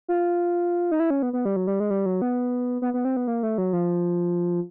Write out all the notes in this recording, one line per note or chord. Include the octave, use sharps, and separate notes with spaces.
F4
D#4
E4
C#4
B3
B3
G3
F#3
G3
G#3
G3
F#3
B3
B3
B3
C4
B3
A#3
A3
F#3
F3